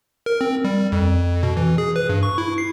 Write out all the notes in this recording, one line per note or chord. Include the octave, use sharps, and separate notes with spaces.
A#4
C4
G3
F2
B2
E3
G#4
B4
G2
C#6
E4
C7